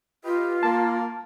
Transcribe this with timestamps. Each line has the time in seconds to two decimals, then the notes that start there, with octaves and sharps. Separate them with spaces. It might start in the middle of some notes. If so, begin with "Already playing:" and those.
0.24 F4 G4 B4 D#5
0.63 A#3 A5